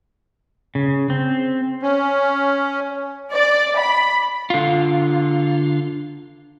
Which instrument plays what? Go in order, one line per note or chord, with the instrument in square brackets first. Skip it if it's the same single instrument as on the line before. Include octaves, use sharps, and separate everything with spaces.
[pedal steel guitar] C#3
C4
[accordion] C#4
[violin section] D5
B5
[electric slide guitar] D3 F4